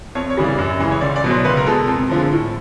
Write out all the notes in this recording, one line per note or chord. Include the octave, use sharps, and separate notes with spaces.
F2 C#5
C#5
C#3 E3 G3
D5
F#2
C#3 E3 G#3
C#5
C#2 D5
D5
B2 F#3
C5
C#2 B4
A#4
B2 G#3 A4
F2
D3 F3 G#3
A2